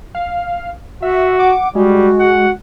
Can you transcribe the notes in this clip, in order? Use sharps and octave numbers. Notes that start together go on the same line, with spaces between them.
F5
F#4 E5
F#5 D6
G3 G#3 F#4
F#5